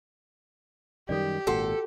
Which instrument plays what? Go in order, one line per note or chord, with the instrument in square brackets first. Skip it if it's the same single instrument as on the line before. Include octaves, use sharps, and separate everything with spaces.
[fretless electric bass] F#2 D#3 G3 [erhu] G4 [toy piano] A4 D5
[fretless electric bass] G#1 A#2 [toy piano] F#4 F#5 [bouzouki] A4